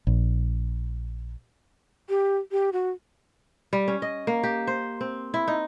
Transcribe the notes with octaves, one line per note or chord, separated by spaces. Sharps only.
A#1
G4
G4
F#4
G3
C#4
D#5
A#3
G4
C5
C4
E4
D#4